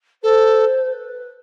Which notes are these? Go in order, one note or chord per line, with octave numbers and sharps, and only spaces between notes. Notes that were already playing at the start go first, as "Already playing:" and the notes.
A4 C5
B4